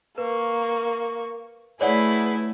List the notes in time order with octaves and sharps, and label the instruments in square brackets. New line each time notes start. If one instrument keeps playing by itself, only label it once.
[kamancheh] A#3 C#6 [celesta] B4
[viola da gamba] A3 E4 [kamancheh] G#4 B4 [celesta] C#5 D5 F#5